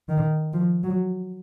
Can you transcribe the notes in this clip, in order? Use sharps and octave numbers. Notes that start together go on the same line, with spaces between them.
D#3
F3
F#3